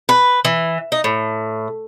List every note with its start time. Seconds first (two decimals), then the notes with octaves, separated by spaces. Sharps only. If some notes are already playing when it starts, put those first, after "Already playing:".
0.09 B4
0.45 E3
0.92 D#4
1.04 A2